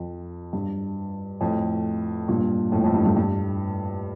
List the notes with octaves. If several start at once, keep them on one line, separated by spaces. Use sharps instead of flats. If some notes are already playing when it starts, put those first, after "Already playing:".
Already playing: F2
G2
F2 A2
G2 A#2
F2 A2
F2
G2
G2
G2